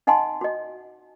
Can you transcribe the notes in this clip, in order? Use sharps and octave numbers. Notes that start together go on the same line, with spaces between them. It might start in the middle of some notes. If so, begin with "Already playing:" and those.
D#4 D#5 F#5 G#5 A5 C6
F#4 D#5